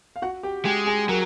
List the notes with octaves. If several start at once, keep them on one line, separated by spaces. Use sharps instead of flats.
F5
F#4 F#5
G4 G5
G#3 G4 G5
G#4 G#5
F#3 A#4 A#5